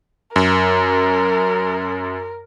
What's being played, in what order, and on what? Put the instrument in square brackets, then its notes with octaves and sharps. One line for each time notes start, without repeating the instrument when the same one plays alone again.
[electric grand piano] F#2 [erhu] A#4